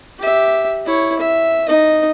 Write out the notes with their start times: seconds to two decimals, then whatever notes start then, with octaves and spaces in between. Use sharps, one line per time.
0.19 G4 E5
0.86 E4 C#5
1.19 E5
1.68 D#4 D#5